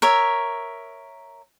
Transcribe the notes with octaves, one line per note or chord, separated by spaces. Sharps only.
A#4 C#5 E5